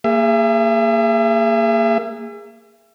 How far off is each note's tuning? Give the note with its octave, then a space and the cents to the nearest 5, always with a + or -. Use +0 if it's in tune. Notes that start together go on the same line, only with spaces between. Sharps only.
A#3 -20 G#4 -20 E5 +35